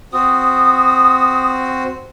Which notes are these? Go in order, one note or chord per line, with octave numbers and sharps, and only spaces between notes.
C4 F#4 D#6